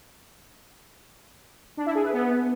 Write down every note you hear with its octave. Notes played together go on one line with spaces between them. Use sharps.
D4
E4
G#4
B4
B3